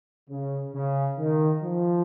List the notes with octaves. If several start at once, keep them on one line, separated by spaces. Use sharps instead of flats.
C#3
C#3
D#3
F3